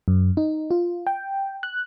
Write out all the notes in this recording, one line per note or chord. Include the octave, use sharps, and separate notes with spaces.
F#2
D#4
F4
G5
F#6